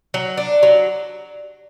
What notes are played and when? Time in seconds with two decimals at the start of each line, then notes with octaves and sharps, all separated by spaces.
0.14 F#3
0.38 D4
0.63 F#3